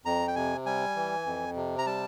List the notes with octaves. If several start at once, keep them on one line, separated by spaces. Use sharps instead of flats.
F2 A#5
G5
C3 G#5
G3 G#5
E3
F2
C3
A#5
G3 A5